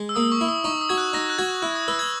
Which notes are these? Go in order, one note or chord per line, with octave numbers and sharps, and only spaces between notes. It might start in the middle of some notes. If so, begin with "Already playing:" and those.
Already playing: G#3
E6
A#3 D#6
C#6
E4
D#6
D#4 C#6
D#6
F#4 G#6
F#6
D#4 A#6
F#6
F#4 G#6
E4 F#6
D#6
B4 E6
G#6